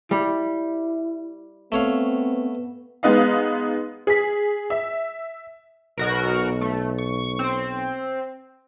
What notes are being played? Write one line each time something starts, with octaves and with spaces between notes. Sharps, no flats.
G3 E4
A3 B3 C4 C#5 F5
G#3 B3 D#4 B4 D#5 F5
G#4 B6
E5
B1 B2 F#4 A#4
A3
C#6
C4